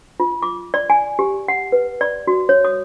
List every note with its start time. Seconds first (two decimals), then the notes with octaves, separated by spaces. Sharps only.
0.20 F4
0.43 D6
0.74 D5
0.90 G#5
1.19 G4
1.48 F#5
1.72 B4
2.01 D5
2.27 F#4
2.49 C#5
2.65 D#6